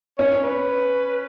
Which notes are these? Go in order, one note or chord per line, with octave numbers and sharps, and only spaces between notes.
C#4 C#5
B4